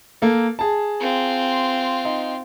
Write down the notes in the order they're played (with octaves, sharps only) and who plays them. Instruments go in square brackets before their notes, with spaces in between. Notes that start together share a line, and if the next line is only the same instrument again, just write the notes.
[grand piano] A#3 A4
G#4 A5
[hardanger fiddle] C4 F4
[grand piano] D#4